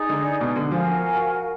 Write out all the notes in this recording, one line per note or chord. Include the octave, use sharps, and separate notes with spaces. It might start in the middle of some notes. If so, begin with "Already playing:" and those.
Already playing: D#4 G#4 D5
D3
B2
D3
F3 F#4 A#4 F5 G#5